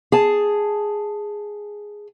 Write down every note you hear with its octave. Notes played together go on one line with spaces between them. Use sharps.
G#4 A5